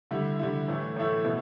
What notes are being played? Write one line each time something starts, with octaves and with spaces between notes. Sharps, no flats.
D3 G3 E4
D3 G3 E4
A2 E3 A3 E4
A2 E3 A3 E4
B2 B3 E4